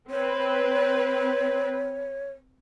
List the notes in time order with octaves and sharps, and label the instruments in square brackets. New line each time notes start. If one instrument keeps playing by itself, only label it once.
[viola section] C4 B4 [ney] C#5